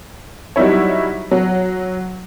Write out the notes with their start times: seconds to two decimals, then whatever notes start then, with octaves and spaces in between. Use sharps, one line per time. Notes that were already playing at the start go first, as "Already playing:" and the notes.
0.56 F#3 G3 D#4 E4 C#5
1.31 F#3